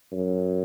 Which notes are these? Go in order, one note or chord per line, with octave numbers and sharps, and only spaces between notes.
F#2